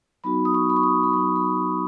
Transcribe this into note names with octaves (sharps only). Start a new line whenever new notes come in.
F#3 B3 D#4 F#4 B5
D#6
C#6
B5
C#6
D#6
B5
F#3 B3 D#4 F#4 C#6
B5